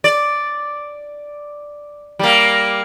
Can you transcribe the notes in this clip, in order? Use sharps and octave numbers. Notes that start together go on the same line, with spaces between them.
D5
G3 A#3